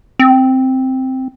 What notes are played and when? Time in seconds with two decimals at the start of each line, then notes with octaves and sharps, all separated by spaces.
0.19 C4